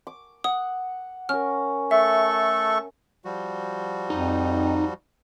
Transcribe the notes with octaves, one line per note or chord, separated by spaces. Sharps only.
D6
F#5 D#6
C#4 A#4 F6
A3 A4 E5 C#6
F3 G3 F#4
F2 D#4